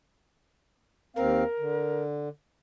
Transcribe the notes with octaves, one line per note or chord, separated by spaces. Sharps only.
D#2 C4 A#4 F5
D3